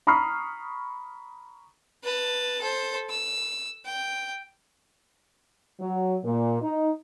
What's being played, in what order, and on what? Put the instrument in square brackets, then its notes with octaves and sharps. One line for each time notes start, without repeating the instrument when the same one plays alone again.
[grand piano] A#5 B5 C#6 D#6 F6 C7
[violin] B4 A5
A4 C5
E6
G5
[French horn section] F#3
A#2
D#4